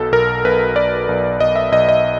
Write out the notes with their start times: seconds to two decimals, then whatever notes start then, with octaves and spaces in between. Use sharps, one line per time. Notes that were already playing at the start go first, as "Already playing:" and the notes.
Already playing: B1 B2 A4
0.12 B1 A#4
0.45 B1 B4
0.76 B1 D5
1.09 B1
1.40 B1 D#5
1.56 E5
1.72 B1 D#5
1.89 D#5